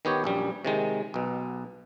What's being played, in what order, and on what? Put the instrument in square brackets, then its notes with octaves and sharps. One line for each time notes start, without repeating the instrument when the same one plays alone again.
[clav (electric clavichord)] D#3 B3 G4 C#5
A#1 F#2 G3
C3 D#3 G#3
B1 B2